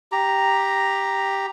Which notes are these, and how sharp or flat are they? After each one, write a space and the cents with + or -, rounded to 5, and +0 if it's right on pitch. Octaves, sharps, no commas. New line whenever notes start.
G4 +0 A#5 +0